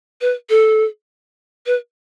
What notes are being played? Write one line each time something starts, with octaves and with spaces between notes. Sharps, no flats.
B4
A4
B4